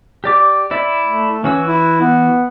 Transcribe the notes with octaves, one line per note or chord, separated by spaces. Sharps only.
G4 D5 D6
E4 D5 E5
A3
E3 C#4 F#4 E6
E4
B3